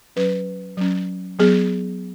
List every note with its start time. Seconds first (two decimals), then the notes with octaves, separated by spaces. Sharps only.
0.16 F#3 C#4 B4
0.77 F#3 C#4
1.39 F#3 B3 G#4